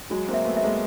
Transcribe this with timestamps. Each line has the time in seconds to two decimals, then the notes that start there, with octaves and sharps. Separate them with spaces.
0.10 F#3 G#3 F#4
0.28 A#3 C4
0.34 E5
0.45 A3 B3
0.57 E5
0.63 G#3 A#3